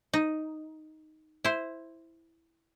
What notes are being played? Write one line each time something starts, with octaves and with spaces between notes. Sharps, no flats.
D#4
E4 C5